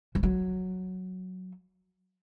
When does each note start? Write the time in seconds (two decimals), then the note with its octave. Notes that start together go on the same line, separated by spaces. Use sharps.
0.15 F3
0.23 F#3